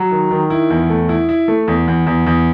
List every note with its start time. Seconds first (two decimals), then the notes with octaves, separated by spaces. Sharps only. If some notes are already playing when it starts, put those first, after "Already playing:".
Already playing: F#3
0.11 D#3
0.31 D#3
0.50 E4
0.70 E2
0.89 A3
1.09 E4
1.29 E4
1.48 A3
1.68 E2
1.88 E2
2.07 E2
2.26 E2